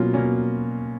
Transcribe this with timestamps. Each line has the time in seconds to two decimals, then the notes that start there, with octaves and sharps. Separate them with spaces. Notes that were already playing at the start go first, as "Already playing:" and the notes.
Already playing: B2 F#3 A#3 C#4 F4
0.14 B2 F#3 A#3 C#4